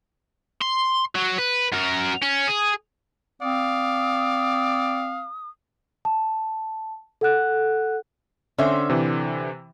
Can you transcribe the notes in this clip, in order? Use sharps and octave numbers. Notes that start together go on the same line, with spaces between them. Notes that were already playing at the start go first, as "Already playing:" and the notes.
C6
F#3
B4
F#2 A#4
C#4
G#4
C4 D5 F5 D#6
A5
A4 F#5 F#6
D3 C4 C#4 C5 E5
C3 E3